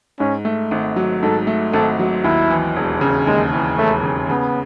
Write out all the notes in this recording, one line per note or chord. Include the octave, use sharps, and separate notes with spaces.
G#2 C#4
A3
G#1
F#3
G#2 A4
A3
G#1 A4
F#3
D#2 E4
E3
E1
C#3
D#2 G#3
E3
E1 A3
C#3
C#3 B3